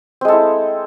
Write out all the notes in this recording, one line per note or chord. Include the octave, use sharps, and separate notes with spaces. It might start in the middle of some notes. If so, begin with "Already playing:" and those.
G#3 C4 E4 A4